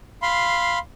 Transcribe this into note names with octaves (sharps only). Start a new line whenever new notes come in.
F5 B5 C6